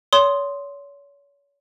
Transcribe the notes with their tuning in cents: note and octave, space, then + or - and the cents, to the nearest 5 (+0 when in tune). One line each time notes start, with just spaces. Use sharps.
C#5 +35 C6 +0 D#6 +0